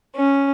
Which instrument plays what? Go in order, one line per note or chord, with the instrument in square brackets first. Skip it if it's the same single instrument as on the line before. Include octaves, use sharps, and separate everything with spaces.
[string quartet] C#4